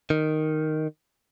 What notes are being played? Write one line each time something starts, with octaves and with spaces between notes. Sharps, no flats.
D#3